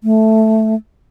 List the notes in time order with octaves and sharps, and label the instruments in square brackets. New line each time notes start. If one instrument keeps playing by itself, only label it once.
[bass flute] A3